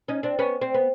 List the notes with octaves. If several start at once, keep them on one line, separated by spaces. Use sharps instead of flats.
C#4 D#4
C4 D4
B3 C#4
C4
B3